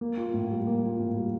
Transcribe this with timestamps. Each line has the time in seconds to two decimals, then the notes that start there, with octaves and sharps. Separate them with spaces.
0.01 A#3
0.17 F4
0.34 A2
0.50 G3
0.67 A#3
0.83 F4
0.99 A2
1.16 G3